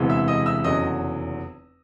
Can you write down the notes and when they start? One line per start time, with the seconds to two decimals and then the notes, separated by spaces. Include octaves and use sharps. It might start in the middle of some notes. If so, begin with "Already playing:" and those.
Already playing: E1 D2 C3 E3 G#3
0.10 E5 E6
0.28 D#5 D#6
0.46 E5 E6
0.64 F1 E2 C#3 F#3 D#5 D#6